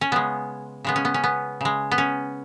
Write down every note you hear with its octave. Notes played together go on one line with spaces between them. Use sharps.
C#4
C#3 G#3 B3
C#3 G#3 B3
C#4
B3
C#4
B3
C#3 G#3
B3
C#4